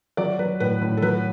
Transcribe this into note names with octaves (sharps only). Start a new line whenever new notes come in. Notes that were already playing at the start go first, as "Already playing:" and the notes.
F#3 D5
F#3 B4
A2 B4
A2
A4
F#3 B4